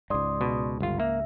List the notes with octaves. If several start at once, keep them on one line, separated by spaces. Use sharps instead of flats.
C#2 G#2 D5 C6 D#6
B2
G1 F4
A#3 E5